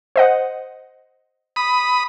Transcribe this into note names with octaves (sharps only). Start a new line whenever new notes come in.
C5 D#5 F#5
B5 D#6